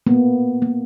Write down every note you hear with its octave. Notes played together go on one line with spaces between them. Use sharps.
A#3 B3
A#3